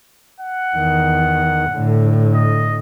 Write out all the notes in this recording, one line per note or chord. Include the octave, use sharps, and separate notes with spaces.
F#5
E2 D#3
A2 D3
D#5